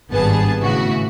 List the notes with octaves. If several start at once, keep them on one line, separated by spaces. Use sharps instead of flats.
G#1 G2 B3 G#4 A5
A2 C#3 E3 F#4